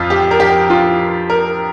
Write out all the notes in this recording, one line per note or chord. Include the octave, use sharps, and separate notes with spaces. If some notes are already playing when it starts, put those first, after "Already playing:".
Already playing: F2 F3 F4
G4
A#4
G4
F4
A#4